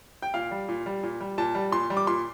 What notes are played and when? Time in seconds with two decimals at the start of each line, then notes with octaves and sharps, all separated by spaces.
0.22 G5
0.34 A#2 F5
0.51 G3
0.69 A#2
0.86 G3
1.03 A#2
1.21 G3
1.38 A#2 A5
1.55 G3
1.72 A#2 C6
1.90 G3
1.97 D6
2.07 A#2 C6